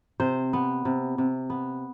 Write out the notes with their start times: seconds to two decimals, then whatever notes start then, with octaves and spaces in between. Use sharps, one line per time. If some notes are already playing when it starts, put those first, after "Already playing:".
0.20 C3 C5
0.53 B3
0.85 C3
1.18 C3
1.50 B3